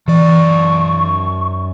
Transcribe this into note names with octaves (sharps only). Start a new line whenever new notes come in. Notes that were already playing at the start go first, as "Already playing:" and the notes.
F#2 E3 D5 C#6